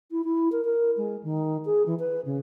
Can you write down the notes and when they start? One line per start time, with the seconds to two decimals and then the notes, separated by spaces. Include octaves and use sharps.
0.11 E4
0.24 E4
0.52 A#4
0.64 A#4
0.97 G#3
1.23 D#3
1.65 G#4
1.86 E3
1.99 B4
2.25 C#3